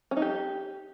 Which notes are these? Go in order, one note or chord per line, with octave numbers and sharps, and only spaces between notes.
C#4
D#4
G4